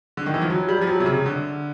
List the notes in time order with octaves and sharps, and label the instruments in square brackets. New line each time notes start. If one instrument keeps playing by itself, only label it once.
[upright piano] D3
D#3
E3
F3
F#3
G3
F3
F#3
C3
C#3
D3